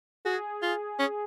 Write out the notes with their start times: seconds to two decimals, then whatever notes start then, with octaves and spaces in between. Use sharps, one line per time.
0.25 F#4 G#4
0.62 F4
0.99 C#4